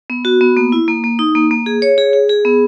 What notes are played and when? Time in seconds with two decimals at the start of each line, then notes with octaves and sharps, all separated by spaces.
0.10 B3
0.25 F#4
0.41 B3
0.57 A#3
0.72 E4
0.88 A#3
1.04 A#3
1.19 D#4
1.35 A#3
1.51 A#3
1.66 G#4
1.82 C#5
1.98 G#4
2.13 G#4
2.29 G#4
2.45 B3